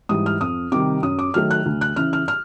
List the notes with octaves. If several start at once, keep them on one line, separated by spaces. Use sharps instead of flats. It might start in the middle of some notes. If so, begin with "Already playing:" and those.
G#2 E3 G3 D#6
F6
F2 D#6
C3 D#3 G3 D6
F#2 D#6
D6
D#3 F#3 A3 F6
F#6
D2
F#6
C#3 E3 F6
F6
F6